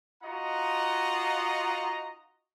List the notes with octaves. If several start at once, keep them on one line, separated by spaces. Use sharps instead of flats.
D#4 F4 F#4 D#5 F#5 A#5